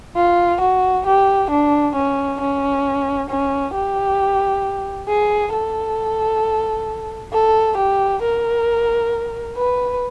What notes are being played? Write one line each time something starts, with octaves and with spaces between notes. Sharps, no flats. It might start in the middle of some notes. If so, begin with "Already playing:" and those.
F4
F#4
G4
D4
C#4
C#4
C#4
G4
G#4
A4
A4
G4
A#4
B4